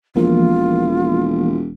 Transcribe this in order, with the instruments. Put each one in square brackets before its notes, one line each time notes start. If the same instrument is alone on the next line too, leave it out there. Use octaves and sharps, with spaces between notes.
[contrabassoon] E1 [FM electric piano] E3 F3 A#3 [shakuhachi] F4